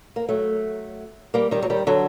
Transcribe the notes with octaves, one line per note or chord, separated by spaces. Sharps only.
A#3
F#3 A3
G3 A#3
D#3 G3
F#3
D#3 G3
D3 F#3